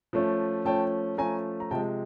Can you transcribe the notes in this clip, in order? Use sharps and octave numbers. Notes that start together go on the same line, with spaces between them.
F3 A3 C#4
F3 A3 C#4 G5 A5
F3 A3 C#4 G#5 A#5
A#5
C3 F3 G#3 G5 A5